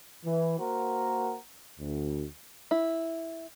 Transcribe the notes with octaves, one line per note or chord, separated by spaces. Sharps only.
E3
A#3 F#4 A#4 C5 F#5 A#5
D2
E4